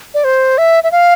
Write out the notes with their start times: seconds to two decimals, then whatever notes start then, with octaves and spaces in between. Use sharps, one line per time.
0.14 D5
0.24 C5
0.58 E5
0.84 E5
0.92 F5